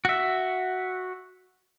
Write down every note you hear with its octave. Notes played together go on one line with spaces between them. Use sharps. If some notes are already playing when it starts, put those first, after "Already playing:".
F#4 E5